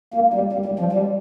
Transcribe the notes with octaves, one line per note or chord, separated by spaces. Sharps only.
A#3
G3
G3
G3
F3
G3